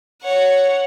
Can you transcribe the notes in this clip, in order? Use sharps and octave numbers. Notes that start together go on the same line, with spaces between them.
C#5 F#5